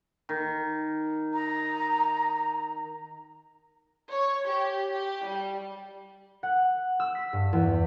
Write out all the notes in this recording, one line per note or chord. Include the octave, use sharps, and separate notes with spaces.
D#3
A#5
C#5
G4
G4
G3
F#5
E6
B6
G2
E2